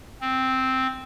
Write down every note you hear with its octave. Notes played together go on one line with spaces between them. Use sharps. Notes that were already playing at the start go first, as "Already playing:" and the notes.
C4